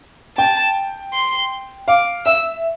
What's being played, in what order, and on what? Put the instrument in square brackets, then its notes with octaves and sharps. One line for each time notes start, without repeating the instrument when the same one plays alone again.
[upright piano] G5 [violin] A5
[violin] C6
[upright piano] F5 [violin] D6
[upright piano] E5 [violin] E6